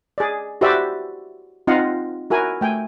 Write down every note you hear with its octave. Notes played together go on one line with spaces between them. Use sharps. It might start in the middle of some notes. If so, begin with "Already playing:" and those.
G#4 D5
E4 F#4 G4 C5 D5 E5
C4 D#4 F4 D#5 F5 F#5
E4 F#4 A#4 G#5
A3 G5 G#5